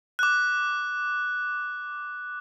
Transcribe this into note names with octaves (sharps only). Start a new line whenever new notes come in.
D6 F#6